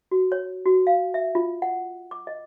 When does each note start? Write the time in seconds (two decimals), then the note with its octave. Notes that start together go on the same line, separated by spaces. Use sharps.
0.11 F#4
0.32 C#5
0.66 F#4
0.87 F5
1.14 E5
1.35 F4
1.62 F#5
2.11 D6
2.27 D#5